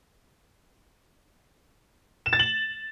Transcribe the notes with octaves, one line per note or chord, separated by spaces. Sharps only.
E7
A6
F#7